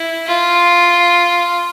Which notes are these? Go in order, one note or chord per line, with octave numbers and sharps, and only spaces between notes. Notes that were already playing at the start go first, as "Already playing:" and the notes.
Already playing: E4
F4